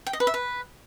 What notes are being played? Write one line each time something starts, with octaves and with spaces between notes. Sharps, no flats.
G5
D#5
B4
E5
B4